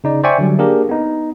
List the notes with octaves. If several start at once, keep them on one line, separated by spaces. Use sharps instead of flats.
C#3 D#4 D5
C5 D5 E5 G5 G#5 C#6
D3 F#3 G3
A#3 D4 G4 G#4 A#4
B3 D#4